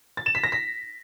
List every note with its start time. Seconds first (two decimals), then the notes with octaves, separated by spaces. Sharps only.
0.17 A6
0.26 E7
0.35 B6
0.44 A#6
0.52 B6